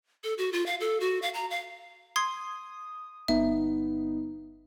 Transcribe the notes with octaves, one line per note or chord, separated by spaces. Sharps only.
A4
F#4
F4
F5
A4
F#4
F5
A#5
F5
C6 D#6 G#6 C7
G1 B3 D#4 E5